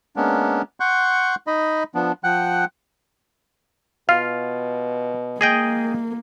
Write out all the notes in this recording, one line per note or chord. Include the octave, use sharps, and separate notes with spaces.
G#3 A#3 B3 C#4 D4
F#5 C6 C#6 F#6 G6
D#4 D#5 B5
F3 B3 D4
F3 F#5 G5 F#6
B2 F4 F5
G#3 A#3 G#4 D#5 G5